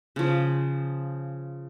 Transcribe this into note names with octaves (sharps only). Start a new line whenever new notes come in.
C#3 F3